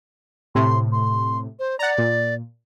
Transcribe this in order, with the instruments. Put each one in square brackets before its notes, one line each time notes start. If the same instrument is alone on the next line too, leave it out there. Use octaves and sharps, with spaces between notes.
[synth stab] A2 C3 [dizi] C6
[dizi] C6
C5
[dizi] D5 [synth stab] F#5 A#5
[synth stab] A#2